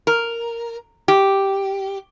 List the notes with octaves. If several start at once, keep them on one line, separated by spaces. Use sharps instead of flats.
A#4
G4